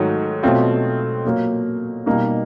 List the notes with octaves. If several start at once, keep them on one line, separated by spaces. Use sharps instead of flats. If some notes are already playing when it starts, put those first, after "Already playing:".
Already playing: G#2 D#3 F#3 A3
B2 F#3 A3 C4 F4
A#2 F#3 A#3
B2 G3 A#3 D#4